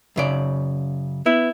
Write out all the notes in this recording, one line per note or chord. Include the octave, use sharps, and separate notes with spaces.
F#2 C#3 D5
B3 E4